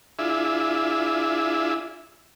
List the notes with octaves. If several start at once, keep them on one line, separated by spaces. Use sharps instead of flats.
D4 E4 F4 G#4 E5